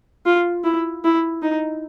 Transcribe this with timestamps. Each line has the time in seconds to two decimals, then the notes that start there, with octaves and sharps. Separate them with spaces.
0.26 F4
0.64 E4
1.04 E4
1.42 D#4